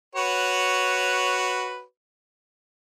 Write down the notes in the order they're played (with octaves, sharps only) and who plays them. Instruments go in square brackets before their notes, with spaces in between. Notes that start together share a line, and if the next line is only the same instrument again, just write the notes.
[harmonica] F#4 B4 C#5